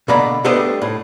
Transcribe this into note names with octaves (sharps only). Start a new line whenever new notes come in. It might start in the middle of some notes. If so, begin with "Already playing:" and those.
B2 D3 A#3 D5 A#5 B5
G3 A3 B3 D4 C5 D#5
A2